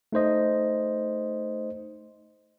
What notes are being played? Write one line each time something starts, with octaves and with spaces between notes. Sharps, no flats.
A3 D#4 C5 D#5